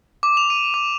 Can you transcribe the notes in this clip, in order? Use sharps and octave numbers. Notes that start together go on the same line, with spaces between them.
D6
F7
D#7
D6